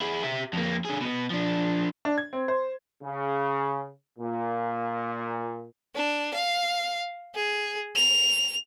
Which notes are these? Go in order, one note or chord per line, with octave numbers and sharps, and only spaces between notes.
E4 G#4
G4 E5
F2 A#3
D3 G#4
B2 B3
F3 D4
D4
G#6
C4
C5
C#3
A#2
D4
F5
G#4
F7